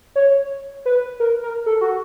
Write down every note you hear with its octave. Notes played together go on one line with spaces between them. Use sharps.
C#5
B4
A#4
A#4
A4
F#4